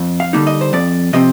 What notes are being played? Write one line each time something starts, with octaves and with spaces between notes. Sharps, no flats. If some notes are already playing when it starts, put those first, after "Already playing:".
Already playing: F2
F5
D3 G3 A#3 D#4
D#5
C5
F2 D5
C3 F3 C4 D#5